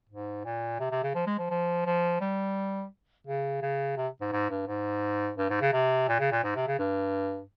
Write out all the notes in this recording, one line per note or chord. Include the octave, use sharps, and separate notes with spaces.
G#2
A#2
C3
C3
C#3
F3
G#3
F3
F3
F3
G3
C#3
C#3
C3
G#2
G#2
G2
G#2
G2
G#2
C#3
C3
A#2
C#3
A#2
G#2
C3
C#3
G2